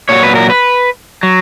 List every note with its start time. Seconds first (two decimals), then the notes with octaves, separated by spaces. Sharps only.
0.09 A#2 F#3 C#5
0.23 B4
0.35 A#4
0.50 B4
1.23 F#3